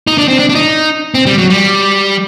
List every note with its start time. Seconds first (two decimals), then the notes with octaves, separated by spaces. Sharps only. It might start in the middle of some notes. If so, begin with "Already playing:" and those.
0.07 D#4
0.18 D4
0.28 C4
0.39 D4
0.49 D4
0.55 D#4
1.14 C4
1.26 G3
1.38 F#3
1.50 G3